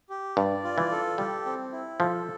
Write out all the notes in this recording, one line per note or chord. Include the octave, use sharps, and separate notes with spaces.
G4
G2 D5
F4
E3
A4
G3 G4
C4
E4
F3 A4